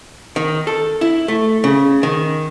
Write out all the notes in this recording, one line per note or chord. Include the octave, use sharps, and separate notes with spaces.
D#3
A4
E4
A3
C#3
D#3